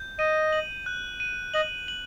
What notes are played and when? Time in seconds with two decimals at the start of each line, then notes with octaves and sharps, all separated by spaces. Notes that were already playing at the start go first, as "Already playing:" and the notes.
Already playing: G6
0.19 D#5 D#7
0.53 F#7
0.86 F#6
1.20 D#7
1.54 D#5 F#7
1.88 F#7